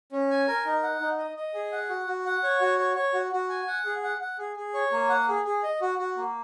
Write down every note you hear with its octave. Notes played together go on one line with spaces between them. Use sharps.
C#4
G#5
A#4
D#4
F#5
D#4
D#5
D#5
G#4
F#5
F#4
F#4
F#5
C#5
F#4
C#5
C#5
F#4
F#4
G#5
F#5
G#4
F#5
F#5
G#4
G#4
C#5
A#3
F#5
G#4
G#4
D#5
F#4
F#4
A#3